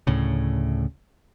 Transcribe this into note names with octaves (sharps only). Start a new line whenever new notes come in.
D2 A2 C#3